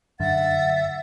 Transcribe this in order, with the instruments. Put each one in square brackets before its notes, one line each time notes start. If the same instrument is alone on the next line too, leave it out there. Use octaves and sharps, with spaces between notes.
[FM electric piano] F#2 D3 [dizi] E5 [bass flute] F#5 [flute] A6